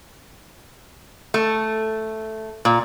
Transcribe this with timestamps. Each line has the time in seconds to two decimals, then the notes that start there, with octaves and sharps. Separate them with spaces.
1.34 A3
2.65 A#2